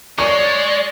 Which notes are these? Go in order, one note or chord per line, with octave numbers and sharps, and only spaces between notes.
G#3 C#5 D5 C#6